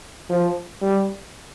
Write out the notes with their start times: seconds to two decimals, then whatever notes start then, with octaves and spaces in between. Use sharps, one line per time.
0.29 F3
0.82 G3